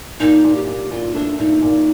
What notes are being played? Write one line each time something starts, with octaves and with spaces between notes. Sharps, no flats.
A#2 D#4
A#2
G4
A#2
A#2 F4
A3 D4
A#2 D#4
A#2